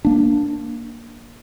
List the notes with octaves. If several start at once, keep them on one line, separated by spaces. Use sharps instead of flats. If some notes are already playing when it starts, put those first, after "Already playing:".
A#3 D4